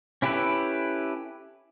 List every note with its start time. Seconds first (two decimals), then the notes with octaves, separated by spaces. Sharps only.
0.22 C#4 E4 G4 A4 B4